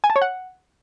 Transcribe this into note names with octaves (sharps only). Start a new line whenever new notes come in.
G#5
A5
C#5
F#5